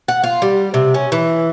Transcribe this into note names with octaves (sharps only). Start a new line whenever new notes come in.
F#5
F4
G3
C3
C#4
E3